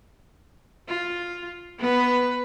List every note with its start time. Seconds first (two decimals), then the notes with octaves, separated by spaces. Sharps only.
0.88 F4
1.79 B3 B4